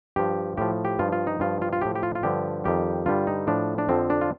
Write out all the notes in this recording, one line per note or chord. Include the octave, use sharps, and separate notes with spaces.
G2 F3 G4
A2 F3 G4
G4
G2 F3 F4
F4
D#4
G2 F3 F4
F4
F4
A2 F3 G4
G4
F4
F4
G2 D3 F3 G4
F2 D#3 G3 G4
G2 D3 G3 F4
D#4
A2 F3 D4
D4
F2 D3 F3 C4
D4
F4